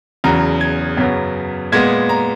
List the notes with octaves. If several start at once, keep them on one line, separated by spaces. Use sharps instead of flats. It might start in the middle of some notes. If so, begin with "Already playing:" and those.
E2 C#3 F#3 A#5
G#6
F#2 C#3 F#3 B3
A#2 G#3 B3 G#6
A#5